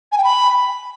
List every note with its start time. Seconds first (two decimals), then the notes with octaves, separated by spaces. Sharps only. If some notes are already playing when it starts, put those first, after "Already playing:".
0.12 G#5
0.18 G5
0.24 B5